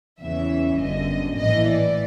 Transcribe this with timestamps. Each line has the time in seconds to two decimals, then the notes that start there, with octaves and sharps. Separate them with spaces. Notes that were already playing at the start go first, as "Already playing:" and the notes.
0.20 E2 C#3 E3 E5
0.80 G1 F#2 D3 D#5
1.38 A#1 A2 E3 D#5
1.68 D5